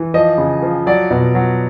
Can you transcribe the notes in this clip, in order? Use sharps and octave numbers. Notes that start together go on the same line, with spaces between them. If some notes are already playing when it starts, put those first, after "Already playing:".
Already playing: E3
F3 D#5
C#3
F3
F#3 D5
B2
F#3